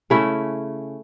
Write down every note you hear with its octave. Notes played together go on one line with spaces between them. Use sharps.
C#3 A3 C#4 E4